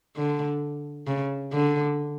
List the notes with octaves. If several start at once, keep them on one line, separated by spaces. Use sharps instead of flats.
D3
C#3
D3